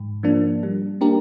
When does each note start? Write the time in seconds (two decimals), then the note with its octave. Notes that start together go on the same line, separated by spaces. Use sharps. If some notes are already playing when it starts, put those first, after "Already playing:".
Already playing: G#2
0.23 F3 A#3 D4
0.63 G3
1.01 A#3 D4 G4 A#4